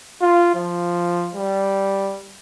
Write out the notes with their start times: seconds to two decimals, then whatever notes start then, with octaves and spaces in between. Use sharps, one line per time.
0.21 F4
0.55 F3
1.35 G3